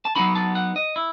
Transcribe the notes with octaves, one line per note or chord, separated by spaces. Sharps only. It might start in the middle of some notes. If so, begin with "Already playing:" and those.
A5
F#3 B3 D#4 B5
A5
F#5
D#5
E4